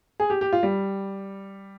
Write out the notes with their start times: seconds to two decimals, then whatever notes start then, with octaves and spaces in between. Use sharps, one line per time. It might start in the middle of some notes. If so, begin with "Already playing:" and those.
0.20 G#4
0.30 G4
0.41 G4
0.53 F4
0.63 G3